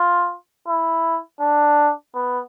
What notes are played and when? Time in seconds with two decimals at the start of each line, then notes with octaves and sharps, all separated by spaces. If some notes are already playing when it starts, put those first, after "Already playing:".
Already playing: F4
0.68 E4
1.41 D4
2.14 B3